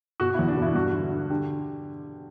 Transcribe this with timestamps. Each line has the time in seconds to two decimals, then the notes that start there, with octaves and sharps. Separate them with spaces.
0.20 B2 F#4
0.34 E4
0.39 E2
0.48 D4
0.57 B2
0.62 E4
0.75 G2 F#4
0.94 D3
1.12 D3
1.30 D3 G4